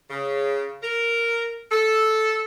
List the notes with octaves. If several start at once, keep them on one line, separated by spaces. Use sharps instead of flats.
C#3
A#4
A4